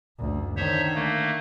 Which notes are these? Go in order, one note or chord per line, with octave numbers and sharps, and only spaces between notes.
F#1 D2
D3 D#3 C5 C#5 E5
A3 A#3